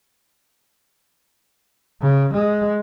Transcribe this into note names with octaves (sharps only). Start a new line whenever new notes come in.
C#3
G#3